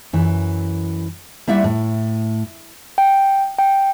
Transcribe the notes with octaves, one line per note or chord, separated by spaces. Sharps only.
F#2 E3
G3 A#3 E4 D5 E5 F#5
A2
G5
G5